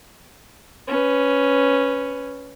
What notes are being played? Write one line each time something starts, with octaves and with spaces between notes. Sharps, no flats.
C#4 B4